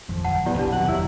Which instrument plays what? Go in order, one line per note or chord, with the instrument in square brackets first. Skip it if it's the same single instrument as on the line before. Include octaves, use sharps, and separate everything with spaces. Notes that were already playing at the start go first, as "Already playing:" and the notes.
[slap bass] G#1 F2 G#2 [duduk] F3
[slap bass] D1 [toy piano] F#5 A5
[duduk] B3 [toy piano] E4 G4 D5
[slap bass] A#1 [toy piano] D4 A5 [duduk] G4
[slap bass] D#2 F#3 C4 [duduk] B2 [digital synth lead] F#5
[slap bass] F1 F2 B2 [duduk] F#3 [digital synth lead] E4